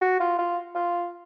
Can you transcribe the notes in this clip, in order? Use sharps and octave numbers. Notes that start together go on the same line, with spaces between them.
F#4
F4
F4
F4